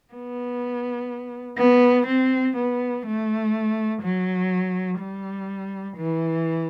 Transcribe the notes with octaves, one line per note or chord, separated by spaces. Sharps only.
B3
B3
C4
B3
A3
F#3
G3
E3